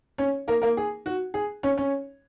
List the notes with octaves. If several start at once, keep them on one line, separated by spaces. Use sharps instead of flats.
C#4 C#5
A#3 A#4
A#3 A#4
G#4
F#4
G#4
C#4 C#5
C#4 C#5